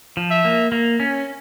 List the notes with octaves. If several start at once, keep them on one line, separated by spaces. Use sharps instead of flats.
F3
E5
A#3
A#3
C#4